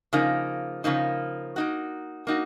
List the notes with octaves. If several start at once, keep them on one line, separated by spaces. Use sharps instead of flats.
C#3 F3 A#3 D#4
C#3 F3 A#3 D#4
A#3 D#4 F#4
A#3 D#4 F#4